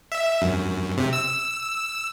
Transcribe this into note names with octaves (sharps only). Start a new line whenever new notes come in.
E5
F#2
C3
E6